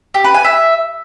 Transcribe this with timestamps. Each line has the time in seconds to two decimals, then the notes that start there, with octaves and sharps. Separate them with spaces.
0.14 G4
0.24 B4
0.34 G#5
0.45 E5